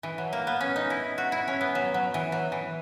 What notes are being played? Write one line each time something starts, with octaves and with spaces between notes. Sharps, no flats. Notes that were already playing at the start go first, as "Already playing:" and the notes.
E3
F#3
A#3
B3
C#4
D#4
E4
F#4
E4
C#4
B3
F#3
F#3
E3
F#3
E3